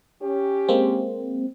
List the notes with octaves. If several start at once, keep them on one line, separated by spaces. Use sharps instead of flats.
C#4 G4
G#3 A#3 C4